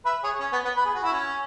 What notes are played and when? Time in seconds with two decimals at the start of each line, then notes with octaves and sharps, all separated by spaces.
0.05 B4 E5
0.24 G#4 C#5
0.40 C#4
0.53 B3
0.65 B3
0.77 B4
0.85 G#4
0.94 F#4
1.04 E4
1.12 C#4